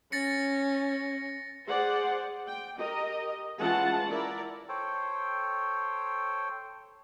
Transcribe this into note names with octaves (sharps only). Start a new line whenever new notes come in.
C#4 A6 A#6 C#7
G#4 C5 D5 F#5
G5
G4 A#4 D#5
E3 G#3 C#4 F4 F#5 A5
E4 A#4 D5
A4 C5 C#5 G5